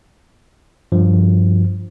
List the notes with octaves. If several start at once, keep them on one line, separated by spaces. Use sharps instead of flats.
G2 F3